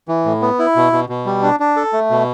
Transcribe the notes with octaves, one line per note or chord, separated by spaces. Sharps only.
E3
A2
B3
E4
B2
B2
B2
G3
D4
D4
A4
A3
B2